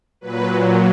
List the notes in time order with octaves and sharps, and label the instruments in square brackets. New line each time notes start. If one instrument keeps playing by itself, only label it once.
[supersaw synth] A#2 F#3 B4